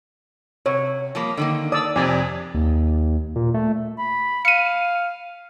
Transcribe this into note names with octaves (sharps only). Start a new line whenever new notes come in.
C3 C#5
F3 G3 A#3
D3 D#3 A#3
D5 D#6 E6
F2 C3 D5 G#5
D#2
A#2
A3
B5
F5 C#7 D#7